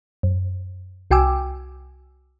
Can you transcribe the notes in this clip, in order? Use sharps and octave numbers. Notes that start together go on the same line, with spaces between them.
F#2
C2 F#4 G5 G#5 D6 E6